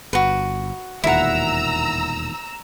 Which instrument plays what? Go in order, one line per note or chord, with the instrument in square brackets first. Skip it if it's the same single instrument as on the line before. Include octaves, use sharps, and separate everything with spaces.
[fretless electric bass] G1 [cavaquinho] F#4 B4
[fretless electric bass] E1 D#2 A#2 [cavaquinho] E4 F#5 [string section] A#5 E6